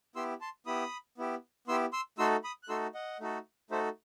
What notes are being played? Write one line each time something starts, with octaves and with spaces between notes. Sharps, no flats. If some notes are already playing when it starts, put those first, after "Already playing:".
B3 E4 G4 C6 E6
A5 C6
B3 E4 G4 B5 D#6
B3 E4 G4
B3 E4 G4 C6 E6
C6 E6
A3 D#4 F#4 A4 C6 E6
B5 D#6
F#6
A3 D#4 F#4 A4 C6 E6
D#5 F#5
A3 D#4 F#4 A4
A3 D#4 F#4 A4 C5 E5